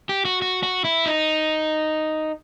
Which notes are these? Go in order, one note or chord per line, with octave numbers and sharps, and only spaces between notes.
G4
F#4
F#4
F#4
E4
D#4